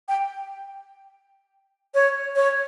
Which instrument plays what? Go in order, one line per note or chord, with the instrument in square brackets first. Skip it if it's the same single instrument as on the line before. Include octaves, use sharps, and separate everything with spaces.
[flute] G5
C#5
C#5